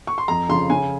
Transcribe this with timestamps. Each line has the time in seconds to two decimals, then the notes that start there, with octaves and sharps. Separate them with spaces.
0.07 C#6
0.18 C6
0.28 F2 A#5
0.49 C#3 F3 C6
0.70 C#3 G#5